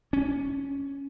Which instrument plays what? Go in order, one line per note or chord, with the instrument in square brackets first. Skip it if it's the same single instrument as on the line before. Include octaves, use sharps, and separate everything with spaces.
[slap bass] C#4